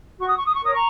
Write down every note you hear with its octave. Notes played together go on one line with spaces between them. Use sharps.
F#4 C#6
D#6
C#6
D#6
C#6
A#4 C#5 D#6
A#5 C#6